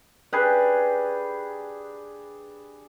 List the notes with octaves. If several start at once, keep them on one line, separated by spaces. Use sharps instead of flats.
D4 G4 G#4 B4